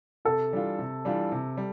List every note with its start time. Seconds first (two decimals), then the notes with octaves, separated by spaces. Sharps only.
0.25 C3 A4
0.52 E3 G3 D4 F4
0.79 C3
1.05 E3 G3 D4 F4
1.32 C3
1.57 G3